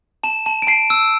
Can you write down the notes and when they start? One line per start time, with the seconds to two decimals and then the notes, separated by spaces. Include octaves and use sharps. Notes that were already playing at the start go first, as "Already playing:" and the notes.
0.23 A5 E7
0.46 A5
0.62 D7
0.67 A5 C7
0.90 E6